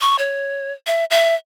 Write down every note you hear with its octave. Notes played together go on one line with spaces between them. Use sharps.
C#6
C#5
E5
E5